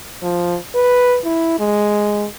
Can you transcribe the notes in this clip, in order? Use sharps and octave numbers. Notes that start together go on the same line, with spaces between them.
F3
B4
E4
G#3